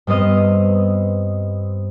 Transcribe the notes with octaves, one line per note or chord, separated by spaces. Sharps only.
G2 B3 C4 D#5 F6